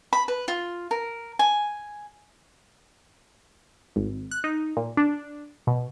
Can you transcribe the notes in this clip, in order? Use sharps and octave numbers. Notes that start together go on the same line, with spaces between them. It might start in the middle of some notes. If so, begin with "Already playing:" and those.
B5
B4
F4
A#4
G#5
G#1
F#6
D#4
A#2
D4
B2